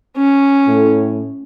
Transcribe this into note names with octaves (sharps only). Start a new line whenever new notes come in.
C#4
A2